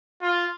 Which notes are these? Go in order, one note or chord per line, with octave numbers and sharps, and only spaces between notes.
F4